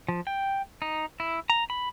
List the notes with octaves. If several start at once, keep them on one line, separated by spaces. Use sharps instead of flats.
F3
G5
D#4
E4
A#5
B5